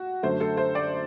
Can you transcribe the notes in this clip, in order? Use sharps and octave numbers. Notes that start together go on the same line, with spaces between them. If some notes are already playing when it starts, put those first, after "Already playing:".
Already playing: F#4
F#2 D3 F#3 A3 C5
A4
C5
D5